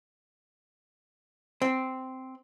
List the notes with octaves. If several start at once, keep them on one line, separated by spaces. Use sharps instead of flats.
C4